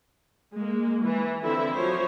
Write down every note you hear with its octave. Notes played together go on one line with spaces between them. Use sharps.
G#3 A#3
E3
D3 F3 C4 E4 A4 E5
F3 F#3 C5 C#5